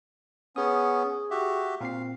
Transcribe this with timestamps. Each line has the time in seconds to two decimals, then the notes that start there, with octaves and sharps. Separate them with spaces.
0.56 B3 C#4 G#4 D#6
1.31 F#4 G4 E5
1.81 A#2 C4 F5 C7